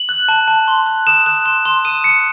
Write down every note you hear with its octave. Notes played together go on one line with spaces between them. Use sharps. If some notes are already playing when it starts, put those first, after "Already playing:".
Already playing: F#7
F#6
A5
A5
C6
F#6
D#6 E7
F#6 E7
C6 E7
C6 E7
D#6 D#7
F#6 C#7